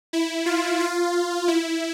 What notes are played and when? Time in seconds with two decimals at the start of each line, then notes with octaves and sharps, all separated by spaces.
0.13 E4
0.46 F4
0.80 F4
1.48 E4